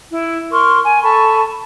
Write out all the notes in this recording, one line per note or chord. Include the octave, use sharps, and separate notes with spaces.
E4
A#4 C6 C#6 F6
G#5
A4 A5 B5 C#6